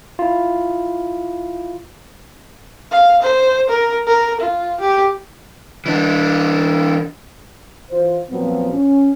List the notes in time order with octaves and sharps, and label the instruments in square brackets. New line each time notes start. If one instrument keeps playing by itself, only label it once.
[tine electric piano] E4 F4
[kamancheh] F5
C5
A#4
A#4
F4
G4
[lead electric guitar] E3 D4
[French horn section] E3 F4 C5
A#2 F3 F#3 B3 C4
C#4